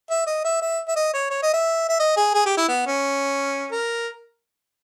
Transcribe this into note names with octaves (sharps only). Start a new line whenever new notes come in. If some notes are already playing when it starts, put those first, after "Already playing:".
E5
D#5
E5
E5
E5
D#5
C#5
C#5
D#5
E5
E5
D#5
G#4
G#4
G4
E4
B3
C#4
A#4